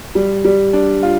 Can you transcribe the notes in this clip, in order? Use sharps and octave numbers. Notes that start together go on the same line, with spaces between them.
G3
G3
D4
F4